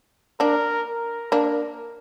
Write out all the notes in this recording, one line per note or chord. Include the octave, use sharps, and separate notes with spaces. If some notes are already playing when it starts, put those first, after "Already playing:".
A#3 D4 A#4
A#4
A#3 D4 A#4